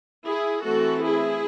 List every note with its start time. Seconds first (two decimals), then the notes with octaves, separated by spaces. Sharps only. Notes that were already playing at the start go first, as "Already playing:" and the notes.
0.26 E4 G#4
0.64 E3 A3 C4 F#4 A4
1.03 E4 G#4